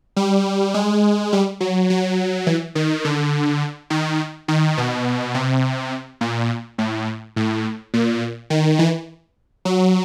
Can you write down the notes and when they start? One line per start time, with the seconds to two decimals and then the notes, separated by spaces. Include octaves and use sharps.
0.17 G3
0.74 G#3
1.33 G3
1.61 F#3
1.90 F#3
2.47 E3
2.75 D#3
3.05 D3
3.90 D#3
4.48 D#3
4.78 B2
5.35 C3
6.21 A#2
6.78 A2
7.36 A2
7.94 A#2
8.50 D#3
8.79 E3
9.65 F#3